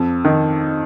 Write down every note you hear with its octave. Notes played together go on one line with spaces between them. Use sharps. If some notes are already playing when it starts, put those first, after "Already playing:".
Already playing: F2
D#3